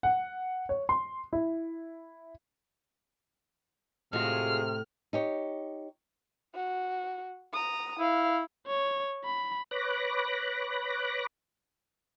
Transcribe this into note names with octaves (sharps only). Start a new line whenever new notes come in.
F#5
C#5
C6
E4
A2 C3 G#3 F4 F#4 F6
D#4 G4 C#5
F#4
A#5 D#6
E4 F5
C#5
B5
B4 C#5 B5 D6 F#6 A#6